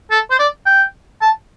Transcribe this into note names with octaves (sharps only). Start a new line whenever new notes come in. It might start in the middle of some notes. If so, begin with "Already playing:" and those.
A4
C5
D5
G5
A5